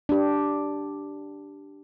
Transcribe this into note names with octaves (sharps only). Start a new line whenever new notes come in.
D4 G4